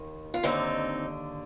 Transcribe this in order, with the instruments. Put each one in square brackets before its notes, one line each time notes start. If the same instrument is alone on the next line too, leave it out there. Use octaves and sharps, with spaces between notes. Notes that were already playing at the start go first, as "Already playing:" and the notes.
Already playing: [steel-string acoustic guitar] D#2 D#3
F4
D#2 D3 C4 D#4